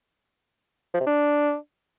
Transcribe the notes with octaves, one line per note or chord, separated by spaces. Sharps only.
F3
C3
D4